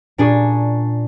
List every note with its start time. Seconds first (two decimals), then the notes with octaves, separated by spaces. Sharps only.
0.18 A#2 D4 G#4 C#6